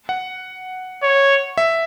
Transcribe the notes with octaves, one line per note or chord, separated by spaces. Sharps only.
F#5
C#5
E5